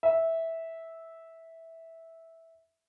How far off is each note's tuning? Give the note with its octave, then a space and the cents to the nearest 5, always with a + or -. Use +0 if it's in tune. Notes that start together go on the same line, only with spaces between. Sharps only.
E5 -10